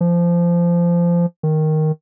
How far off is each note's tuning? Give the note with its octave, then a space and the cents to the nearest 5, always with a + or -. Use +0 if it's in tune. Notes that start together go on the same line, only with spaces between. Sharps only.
F3 -20
D#3 +0